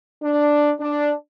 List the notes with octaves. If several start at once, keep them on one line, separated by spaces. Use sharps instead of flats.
D4
D4